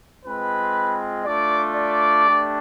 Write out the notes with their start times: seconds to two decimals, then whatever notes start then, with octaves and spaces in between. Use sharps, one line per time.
0.24 G#3 C4 F4 B4 B5
1.24 A3 D4 F4 D5 D6
1.75 D5 D6
2.26 A3 D4 G4